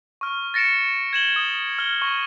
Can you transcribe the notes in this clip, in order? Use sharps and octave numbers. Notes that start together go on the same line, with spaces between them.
C#6 F6
A6 A#6 C#7 D7 E7
G#6 E7 F#7 G7
D#6
F6 G7
C#6